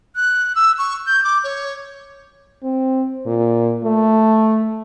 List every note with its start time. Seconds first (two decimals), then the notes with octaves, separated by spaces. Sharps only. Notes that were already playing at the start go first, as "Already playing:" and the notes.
0.16 F#6
0.55 E6
0.78 C#6
1.07 G6
1.24 D6
1.44 C#5
2.63 C4
3.27 A#2
3.84 A3